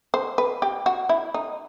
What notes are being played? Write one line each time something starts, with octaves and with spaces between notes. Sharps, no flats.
C5
B4
G4
F#4
E4
D#4